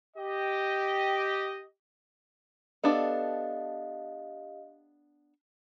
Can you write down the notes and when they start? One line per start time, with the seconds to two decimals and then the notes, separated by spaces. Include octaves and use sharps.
0.16 G4 D#5
2.84 B3 D4 G4 A4 D#5 F5